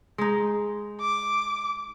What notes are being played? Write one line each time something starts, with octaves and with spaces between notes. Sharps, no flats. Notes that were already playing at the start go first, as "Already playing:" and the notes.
G#3 D#4
D6